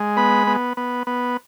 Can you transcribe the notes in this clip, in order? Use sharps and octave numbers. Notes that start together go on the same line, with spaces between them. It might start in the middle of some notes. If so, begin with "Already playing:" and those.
Already playing: G#3
B3 B5
B3
B3
B3